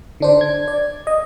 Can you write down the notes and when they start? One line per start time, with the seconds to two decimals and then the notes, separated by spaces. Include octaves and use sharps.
0.20 D3 D4 C5
0.41 G#6
0.68 D5
1.07 D#5